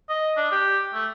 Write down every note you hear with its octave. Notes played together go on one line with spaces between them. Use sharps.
D#5
D4
G4
A3